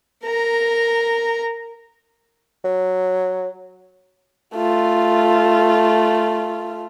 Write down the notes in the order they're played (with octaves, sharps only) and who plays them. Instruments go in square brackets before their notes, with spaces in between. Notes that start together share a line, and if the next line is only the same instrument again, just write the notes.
[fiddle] A#4 A#5
[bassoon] F#3
[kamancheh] A3 F4